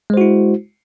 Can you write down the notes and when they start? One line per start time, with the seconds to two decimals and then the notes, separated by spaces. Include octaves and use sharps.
0.10 G#3
0.14 C5
0.17 F#4
0.21 E4